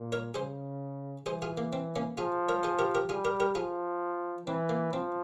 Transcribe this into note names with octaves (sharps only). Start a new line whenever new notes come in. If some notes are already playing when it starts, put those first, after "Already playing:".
Already playing: A#2
A#4 C#5
C#3 G#4 C5
E3 G#4 C5
F4 G#4
A#3
C4
A#3 C#4
F3 F4 G#4
A#4 C#5
G#4 C5
G4 A#4
G4 A#4
G3 F4 G#4
G4 A#4
G4 A#4
F3 F4 G#4
E3 C4
A#3
F3 C4